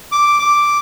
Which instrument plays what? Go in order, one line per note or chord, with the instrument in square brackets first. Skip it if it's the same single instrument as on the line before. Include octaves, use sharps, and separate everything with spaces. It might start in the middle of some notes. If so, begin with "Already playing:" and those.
[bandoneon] D6
D6